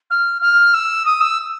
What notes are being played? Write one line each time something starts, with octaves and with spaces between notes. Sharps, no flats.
F6
F6
E6
D#6
E6